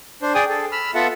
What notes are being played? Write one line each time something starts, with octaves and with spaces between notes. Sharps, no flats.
D4 C5
G#4 D5 G5 G#5 D#6
G#4 A4
B5 E6 F6
B3 F4 A4 E5 F#5